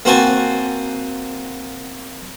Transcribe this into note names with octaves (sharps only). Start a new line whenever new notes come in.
A#3 C4 F#4 C5 G#5 A5